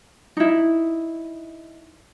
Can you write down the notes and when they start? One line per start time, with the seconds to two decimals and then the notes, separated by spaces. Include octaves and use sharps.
0.37 D#4 E4